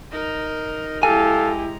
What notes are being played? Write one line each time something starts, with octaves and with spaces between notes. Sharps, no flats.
D#4 A#4
G#3 E4 G4 A4 F5 G#5 A#5